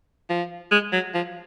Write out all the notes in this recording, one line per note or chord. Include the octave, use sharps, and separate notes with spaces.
F3
G#3
F#3
F3